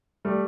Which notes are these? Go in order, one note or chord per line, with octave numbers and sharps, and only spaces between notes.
G3 A3